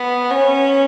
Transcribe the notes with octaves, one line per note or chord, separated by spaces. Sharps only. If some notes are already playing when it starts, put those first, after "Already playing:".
Already playing: B3
C#4